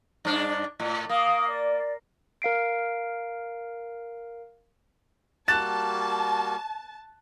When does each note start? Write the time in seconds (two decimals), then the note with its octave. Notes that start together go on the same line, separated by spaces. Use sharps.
0.25 G2 D4
0.80 A2
1.09 A#3 F5 D#6
1.48 D5
2.42 A#4 F5 C7 D7
5.48 G3 A#3 F#4 A5 F#6 A6 E7